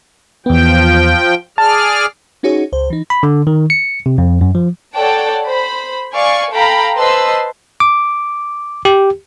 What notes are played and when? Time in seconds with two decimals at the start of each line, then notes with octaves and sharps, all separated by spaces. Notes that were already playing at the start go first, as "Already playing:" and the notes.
0.46 E2 F3 B3 G5
1.58 G#4 D5 A5 F6
2.43 C#4 D#4 F#4 G#4 C#5
2.72 C#2 C5
2.90 E3 D#4
3.10 B5
3.23 D3
3.47 D#3
3.70 C#7
4.06 C3
4.18 F2
4.41 F#2
4.55 F3
4.95 A4 C#5 D5 F#5 G5 A5
5.45 C5 B5
6.15 D5 F5 G#5 C#6
6.52 A4 F5 G5 A#5 B5
6.96 B4 C5 D#5 A5 C6 E6
7.80 D6
8.85 G4